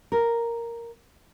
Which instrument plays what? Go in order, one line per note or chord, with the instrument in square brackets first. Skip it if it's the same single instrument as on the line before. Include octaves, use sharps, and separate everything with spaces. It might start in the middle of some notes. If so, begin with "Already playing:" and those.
[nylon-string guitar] A#4